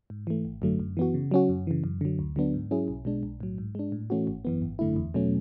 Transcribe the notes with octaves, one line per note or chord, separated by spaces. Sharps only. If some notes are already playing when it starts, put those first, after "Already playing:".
G#2
E3 A3
G#1
F#2 D3 F#3 A3
F#2
E3 B3 F#4
C#3
F#3 C#4 F#4
F#2
C#3 E3
F#2
D3 F#3
D2
D3 F#3 B3 D4
G#2
F#3 C#4 E4 G#4
B1
B2 G#3 D4
B1
A2 F#3
G#2
G#3 D4
A2
E3 A3 C#4 F#4
G#1
F#2 E3 B3
G#1
F#2 D3 A3 E4
E2
B2 F#3 A3 C#4